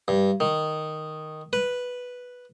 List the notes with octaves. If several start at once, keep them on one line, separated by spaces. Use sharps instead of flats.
G2
D#3
B4